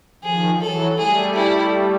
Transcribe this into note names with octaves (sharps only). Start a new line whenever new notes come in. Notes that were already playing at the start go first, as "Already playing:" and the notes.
D#3 F3 G#4
E3 F#3 A4
G3 A3 G#4
E4